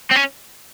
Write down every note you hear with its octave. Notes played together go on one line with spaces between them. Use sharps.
C4
C#4